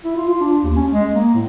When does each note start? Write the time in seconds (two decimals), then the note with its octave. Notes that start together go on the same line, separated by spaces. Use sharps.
0.05 E4
0.17 F4
0.29 F4
0.41 D4
0.64 D#2
0.76 C#4
0.92 G#3
1.15 A#3
1.35 A2